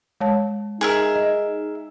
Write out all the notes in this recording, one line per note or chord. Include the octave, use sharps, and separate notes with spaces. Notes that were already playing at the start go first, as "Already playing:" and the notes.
G#3 C#5 A5
D#4 G#4 A#4 E5
D#5